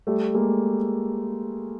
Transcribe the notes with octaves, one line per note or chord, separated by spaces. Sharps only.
G3 A3
G#3 A#3